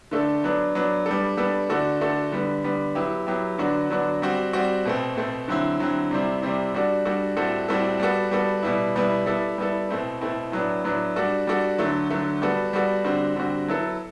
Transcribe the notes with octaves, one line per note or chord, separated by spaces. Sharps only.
D3 A3 D4 A4
F#3 B3 D4
F#3 B3 D4
G3 B3 D4 A4
G3 B3 D4 A4
D3 A3 D4 F#4 A4
D3 A3 D4 F#4 A4
D3 G3 B3
D3 G3 B3
F#3 B3 E4 G4
F#3 B3 E4 G4
D3 F#3 B3 D4 F#4
D3 F#3 B3 D4 F#4
G3 C4 F#4
G3 C4 F#4
B2 A3 C4
B2 A3 C4
D3 F#3 C4 E4
D3 F#3 C4 E4
C3 G3 C4 E4
C3 G3 C4 E4
G3 D4 F#4 A4
G3 D4 F#4 A4
A2 G3 C4 F#4 A4
A2 G3 C4 F#4 A4
G3 B3 F#4 A4
G3 B3 F#4 A4
B2 G3 B3 E4
B2 G3 B3 E4
G3 B3 E4 A4
G3 B3 E4 A4
B2 A3 C4 E4
B2 A3 C4 E4
A2 F#3 B3 D4
A2 F#3 B3 D4
G3 D4 F#4 A4
G3 D4 F#4 A4
D3 F#3 A3
D3 F#3 A3
G3 B3 F#4 A4
G3 B3 F#4 A4
D3 G3 C4 F#4
D3 G3 C4 F#4
F#3 B3 E4 A4